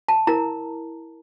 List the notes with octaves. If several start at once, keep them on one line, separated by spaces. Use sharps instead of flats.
A5
E4 A#4 A#5